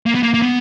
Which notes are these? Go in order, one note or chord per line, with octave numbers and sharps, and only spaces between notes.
A#3
B3
A#3
A#3
B3